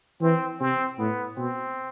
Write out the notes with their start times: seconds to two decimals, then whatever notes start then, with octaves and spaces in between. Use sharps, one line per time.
0.21 E3 C4
0.60 C3 C4
0.99 A2 B3
1.37 B2 C4